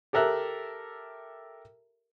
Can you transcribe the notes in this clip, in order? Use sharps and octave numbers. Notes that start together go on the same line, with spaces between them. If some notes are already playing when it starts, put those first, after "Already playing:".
G4 A4 A#4 E5 F#6